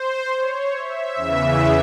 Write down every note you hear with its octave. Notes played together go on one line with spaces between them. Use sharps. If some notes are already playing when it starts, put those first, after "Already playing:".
Already playing: C5
C#5
E5
E2 C#3 E3